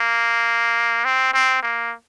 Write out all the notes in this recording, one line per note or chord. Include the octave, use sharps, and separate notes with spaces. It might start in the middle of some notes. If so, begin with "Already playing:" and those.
Already playing: A#3
C4
C4
A#3